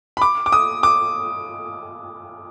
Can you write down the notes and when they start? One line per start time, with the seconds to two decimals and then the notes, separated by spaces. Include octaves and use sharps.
0.17 B5
0.22 D6
0.46 D6
0.52 D#6
0.83 D6